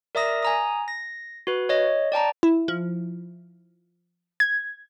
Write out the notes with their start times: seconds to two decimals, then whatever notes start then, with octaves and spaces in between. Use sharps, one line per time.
0.15 A#4 D5 E5 A#5 D#6 A#6
0.42 G#5 A#5 D#6
0.88 A#6
1.47 F#4 B4
1.69 C#5 D#5
2.12 D5 G5 A5 A#5
2.43 E4
2.68 F3
4.40 G#6